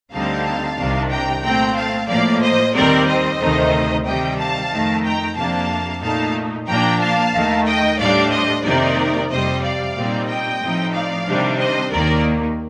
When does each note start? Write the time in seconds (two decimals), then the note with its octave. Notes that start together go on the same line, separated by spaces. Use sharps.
0.12 D2 D3 G3 C4 D#4 F5 A5
0.77 C2 C3 D#3 G3 D4
1.10 G5 A#5
1.43 A#2 A3 C4 G5 A#5
1.76 F5 A5
2.08 A2 F3 A#3 D5 F5
2.41 C5 D#5
2.74 D#2 D#3 G3 C4 A#4 D5
3.07 C5 D#5
3.40 D2 C3 D#3 A3 D#4
4.05 C3 D#3 G3 D#5 G5
4.38 F5 A5
4.71 F2 D#3 A3
5.04 G5 A#5
5.36 F2 C3 F3 A#3 D4 F5 A5
6.02 A#2 A3 D#4 F5 A5
6.68 A#2 F3 A#3 D4 G5 A#5
7.00 F5 A5
7.33 D#2 D#3 A3
7.66 D#5 G5
7.99 A2 G3 D4 D5 F5
8.32 C5 D#5
8.64 F2 C3 D#3 A#3 D#4 A#4 D5
9.30 F2 C3 G3 C5 D#5
9.63 D5 F5
9.96 A#2 G3 C4 D#4
10.28 D#5 G5
10.61 A2 F3 C4 D#4
10.93 D5 F5
11.26 C3 D#3 G3 D4
11.59 C5 D#5
11.92 D#2 D#3 A#3 A#4 D5